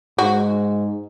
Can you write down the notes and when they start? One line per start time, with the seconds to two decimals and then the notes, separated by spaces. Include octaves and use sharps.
0.18 G#2 F#4